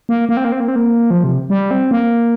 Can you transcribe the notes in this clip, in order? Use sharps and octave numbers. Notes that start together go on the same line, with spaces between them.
A#3
A#3
C4
A#3
C4
A#3
C4
A#3
F3
C3
G3
C4
A#3